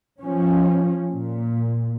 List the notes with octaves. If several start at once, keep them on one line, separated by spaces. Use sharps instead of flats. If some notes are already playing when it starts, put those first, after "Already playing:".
F3 C#4
A#2